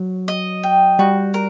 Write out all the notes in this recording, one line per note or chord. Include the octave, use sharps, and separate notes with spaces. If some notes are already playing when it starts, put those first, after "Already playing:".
Already playing: F#3
D#5
G5
G3 F#4
A#4